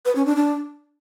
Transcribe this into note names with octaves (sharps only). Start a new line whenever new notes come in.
B4
C#4
D4
D4